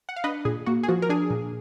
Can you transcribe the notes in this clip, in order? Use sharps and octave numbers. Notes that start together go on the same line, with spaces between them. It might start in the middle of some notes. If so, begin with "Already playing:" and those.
F#5
F5
D4 B4 D#5
A#2 G#4
A#3 F#4
G#4
F3 F#4
A#4
D4 G#4
A#2